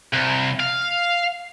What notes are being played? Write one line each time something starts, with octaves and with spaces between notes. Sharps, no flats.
C2
F5